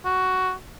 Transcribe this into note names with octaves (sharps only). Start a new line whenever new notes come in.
F#4